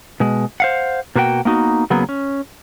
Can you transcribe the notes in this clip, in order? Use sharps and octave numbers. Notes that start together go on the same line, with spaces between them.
B2 G#3
C5 F5 F#5
B2 A#3 F#4 A#4 G5
A#3 B3 D#4 F#4
C#3 F#3 A#3 B3 G#4
C#4